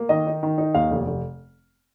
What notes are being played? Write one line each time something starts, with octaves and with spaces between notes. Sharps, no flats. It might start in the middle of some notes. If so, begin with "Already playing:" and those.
Already playing: A#3
D#3 D#5
D#4
D#3
D#4
D#2 F5
F1
F1